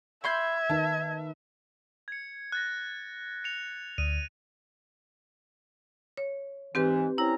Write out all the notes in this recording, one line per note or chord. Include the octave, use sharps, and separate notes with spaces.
E5 B5 C6 G6 G#6
D#3 D#4 B4 A5
G#6 C#7
F#6 A6 A#6
C#7 F7
D2 D#7
C#5
G#2 E3 C4 G4 B4
C4 C#4 E4 A#5